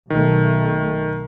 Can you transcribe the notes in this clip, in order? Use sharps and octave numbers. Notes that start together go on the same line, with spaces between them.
B1 D#3 A3